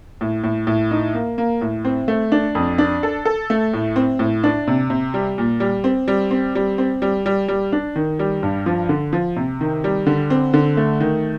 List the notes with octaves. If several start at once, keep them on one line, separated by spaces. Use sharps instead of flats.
A2
A2
A2
D#4
A#3
A#3
A2
C4
A3
D4
F2
D4
A4
A4
A3
A2
C4
A2
D4
C3
C3
G3
A#2
G3
C4
G3
C4
G3
C4
G3
G3
G3
D4
D#3
G3
G2
F3
D3
F3
C3
D#3
G3
D3
C4
D3
A3
D#3